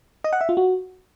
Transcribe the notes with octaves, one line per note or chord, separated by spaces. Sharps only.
D#5
F#5
E5
F4
F#4